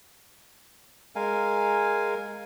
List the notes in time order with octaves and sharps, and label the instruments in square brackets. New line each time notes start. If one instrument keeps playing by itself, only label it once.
[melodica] G#3 A#4 F5 G#5